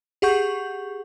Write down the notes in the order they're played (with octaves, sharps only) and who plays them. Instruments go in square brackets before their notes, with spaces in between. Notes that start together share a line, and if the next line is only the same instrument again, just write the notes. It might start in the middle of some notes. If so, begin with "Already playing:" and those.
[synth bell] G4 G#4 F#5 C#6 G6